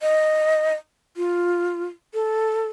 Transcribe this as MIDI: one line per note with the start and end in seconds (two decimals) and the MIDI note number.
0.01 0.74 75
1.17 1.83 65
2.14 2.69 69